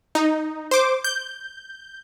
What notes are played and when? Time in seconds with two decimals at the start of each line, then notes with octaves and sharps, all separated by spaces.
0.15 D#4
0.71 C5 D6
1.04 G6